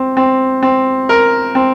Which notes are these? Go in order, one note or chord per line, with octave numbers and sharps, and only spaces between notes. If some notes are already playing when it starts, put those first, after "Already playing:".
Already playing: C4
C4
C4
A#4
C4